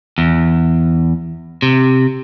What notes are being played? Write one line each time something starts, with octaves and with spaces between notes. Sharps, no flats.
E2
C3